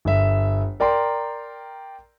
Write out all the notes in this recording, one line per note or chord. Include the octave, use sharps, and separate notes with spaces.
G1 E5
A#4 D5 G5 A#5 C6